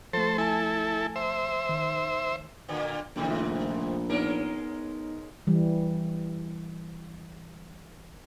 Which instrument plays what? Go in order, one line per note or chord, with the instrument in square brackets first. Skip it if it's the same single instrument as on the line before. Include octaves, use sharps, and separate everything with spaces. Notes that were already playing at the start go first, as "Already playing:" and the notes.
[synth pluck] F3 A3 [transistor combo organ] A4 C5
[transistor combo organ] E4 A4 [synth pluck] G#5 A5
[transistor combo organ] C5 E5
[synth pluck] D#3
[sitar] A2 D3 A#3
[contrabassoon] A#1 [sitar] G#2 C3 D#3
[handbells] A3 F4 E5
[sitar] G#3 C#4 A#4 [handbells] B3 D#4
[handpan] E3 G3